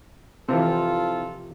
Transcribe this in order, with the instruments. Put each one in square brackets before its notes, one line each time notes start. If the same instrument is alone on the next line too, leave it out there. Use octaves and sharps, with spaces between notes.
[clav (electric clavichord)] C3 F3 [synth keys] E3 C4 [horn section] F4 A4